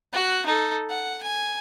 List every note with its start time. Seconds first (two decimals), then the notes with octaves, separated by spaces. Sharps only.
0.13 F#4 F#6
0.46 D#4 A4
0.90 F#5
1.23 G#5